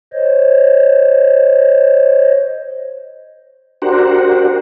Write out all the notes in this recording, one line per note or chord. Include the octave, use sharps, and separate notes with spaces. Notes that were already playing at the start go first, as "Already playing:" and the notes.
C5 C#5 D#5
D4 F#4 G4 A#4 C5 F#5